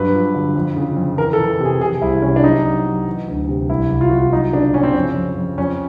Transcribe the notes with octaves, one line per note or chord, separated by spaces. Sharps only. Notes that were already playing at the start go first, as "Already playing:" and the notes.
Already playing: G2 F#3 B4
F3
D3
F2
C#3
F2
E3 A#4
A4
E3
C3 G#4
C3 G#4
C2 E4
C3 C#4
D4
F#3 D#4
F#3
F#3
E3
D2
C3
C2 E4
C2
F4
C2 F#4
F4
F#3 D#4
C#3 D4
C#3 C#4
C4
F2 C#4
F2
F2
F2 C#4